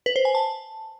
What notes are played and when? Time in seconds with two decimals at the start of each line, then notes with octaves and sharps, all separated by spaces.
0.06 B4
0.16 C5
0.25 G#5
0.35 A5